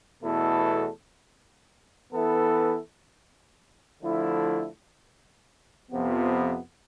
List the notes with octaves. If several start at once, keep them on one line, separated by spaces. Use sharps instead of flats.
E2 B2 A3 E4 A4
E3 B3 E4 A4
D3 F3 A3 E4
F2 C3 F3 B3